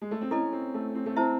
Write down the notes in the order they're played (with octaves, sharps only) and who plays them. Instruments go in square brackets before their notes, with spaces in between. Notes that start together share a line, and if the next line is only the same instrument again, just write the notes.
[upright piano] G#3
A3
C4
[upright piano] C#4 [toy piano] E4 A4 D#5
[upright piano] C4
A3
C4
A3
[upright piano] C4 [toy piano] E4 C5 E5 A5